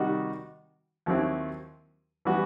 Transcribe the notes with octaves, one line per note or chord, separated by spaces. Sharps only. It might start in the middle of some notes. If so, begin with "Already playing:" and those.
Already playing: C3 D#3 G3 D#4 F#4
D#2 D#3 F#3 C4 E4
E3 G3 B3 F#4